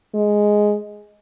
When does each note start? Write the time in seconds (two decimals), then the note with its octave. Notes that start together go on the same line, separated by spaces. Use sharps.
0.14 G#3